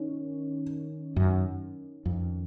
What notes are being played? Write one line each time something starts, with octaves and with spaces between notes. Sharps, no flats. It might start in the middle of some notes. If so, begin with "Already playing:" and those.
Already playing: D#3 C#4
F#2
F2